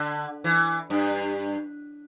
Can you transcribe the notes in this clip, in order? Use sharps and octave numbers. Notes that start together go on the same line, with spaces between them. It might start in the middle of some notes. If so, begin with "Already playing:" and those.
Already playing: D3
E3
G2